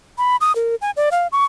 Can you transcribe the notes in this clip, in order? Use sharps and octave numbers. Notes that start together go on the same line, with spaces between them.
B5
D#6
A#4
G#5
D5
F5
C#6